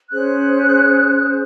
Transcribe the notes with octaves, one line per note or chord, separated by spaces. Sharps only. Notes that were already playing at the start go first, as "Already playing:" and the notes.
C#4 G#4 C5 F#6